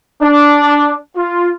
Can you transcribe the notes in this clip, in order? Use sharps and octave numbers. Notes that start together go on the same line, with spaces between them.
D4
F4